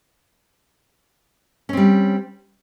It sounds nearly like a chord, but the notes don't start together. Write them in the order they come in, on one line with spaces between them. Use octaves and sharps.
C#4 C4 G3